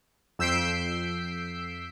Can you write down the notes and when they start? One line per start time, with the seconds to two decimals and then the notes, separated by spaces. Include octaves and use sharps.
0.39 F2 E6 G6 B6 C7 D7